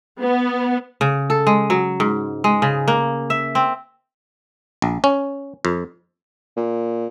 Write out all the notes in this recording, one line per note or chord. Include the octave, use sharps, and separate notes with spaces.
B3
C#3
A4
G#3
F#3
G#2
G#3
C#3
A#3
E5
C4
A#1
C#4
F2
A#2